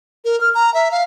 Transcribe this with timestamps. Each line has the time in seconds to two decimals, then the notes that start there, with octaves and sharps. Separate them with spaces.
0.25 A#4
0.41 F6
0.55 A#5
0.74 E5
0.91 F5